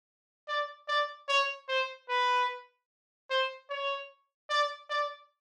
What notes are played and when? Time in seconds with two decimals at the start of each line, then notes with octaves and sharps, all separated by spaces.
0.48 D5
0.88 D5
1.29 C#5
1.69 C5
2.09 B4
3.30 C5
3.70 C#5
4.50 D5
4.90 D5